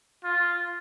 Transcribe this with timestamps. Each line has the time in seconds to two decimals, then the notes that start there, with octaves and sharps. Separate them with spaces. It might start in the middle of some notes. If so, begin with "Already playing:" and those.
0.24 F4